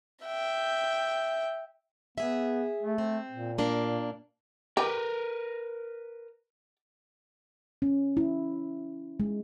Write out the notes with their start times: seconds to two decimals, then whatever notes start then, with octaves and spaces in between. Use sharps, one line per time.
0.25 E5 G5
2.18 B3 G#4 E5
2.82 A3
2.98 C4
3.31 A#2
3.58 A#3 D4
4.77 G4 A#4 B4
7.82 C#4
8.17 E4
9.20 G#3